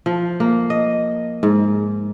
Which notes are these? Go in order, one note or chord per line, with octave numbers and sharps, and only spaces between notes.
F3
A#3
D#5
G#2